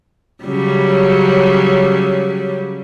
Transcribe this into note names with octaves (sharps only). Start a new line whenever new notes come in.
C#3 F#3 G3